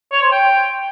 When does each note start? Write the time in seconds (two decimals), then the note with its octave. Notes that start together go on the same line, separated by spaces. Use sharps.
0.12 C#5
0.22 C5
0.31 G5